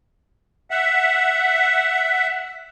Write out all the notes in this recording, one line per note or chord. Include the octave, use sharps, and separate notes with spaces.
E5 F#5